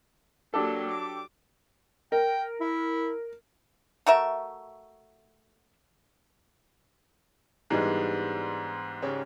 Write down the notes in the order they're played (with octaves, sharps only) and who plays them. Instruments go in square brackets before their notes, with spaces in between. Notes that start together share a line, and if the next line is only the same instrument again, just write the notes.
[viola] F#3 A#3 [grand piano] D4 G4 A4
[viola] D6
[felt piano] A#4 [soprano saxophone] G5
[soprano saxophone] E4
[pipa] A3 F#4 A#4 E5
[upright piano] G#2 G3 G#3 [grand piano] E3 B3 D4
[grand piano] C#3 C#4 G4